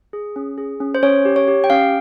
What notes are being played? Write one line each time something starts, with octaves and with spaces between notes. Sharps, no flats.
G#4
C#4
G#4
C#4
C5
C#4 C#5
G4
C#5
G4
G5
C#4 F5